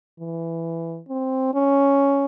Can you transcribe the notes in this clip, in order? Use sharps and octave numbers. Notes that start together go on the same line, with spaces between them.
E3
C4
C#4